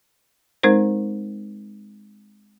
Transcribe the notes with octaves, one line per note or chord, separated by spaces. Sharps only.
G#3 C4 D#4 A#4 C5